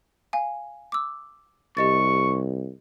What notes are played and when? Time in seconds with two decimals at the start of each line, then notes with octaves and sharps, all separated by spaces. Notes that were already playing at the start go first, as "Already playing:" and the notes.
0.33 F5 G#5
0.92 D6 E6
1.77 C2 G4 D#5 C#6 A6